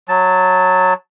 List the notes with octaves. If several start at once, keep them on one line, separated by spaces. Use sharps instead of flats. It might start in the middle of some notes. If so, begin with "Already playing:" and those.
F#3 A5